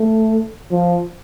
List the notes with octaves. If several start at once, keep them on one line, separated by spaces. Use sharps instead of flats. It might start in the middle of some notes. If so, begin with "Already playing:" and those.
Already playing: A3
F3